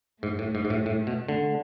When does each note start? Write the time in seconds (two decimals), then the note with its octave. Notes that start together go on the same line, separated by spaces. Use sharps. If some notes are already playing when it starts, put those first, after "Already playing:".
0.23 G#2 A3
0.39 A2
0.55 G#2
0.65 G#2
0.70 A2
0.86 A2
1.07 B2
1.28 D3